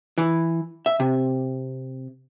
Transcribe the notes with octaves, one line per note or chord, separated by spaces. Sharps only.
E3
E5
C3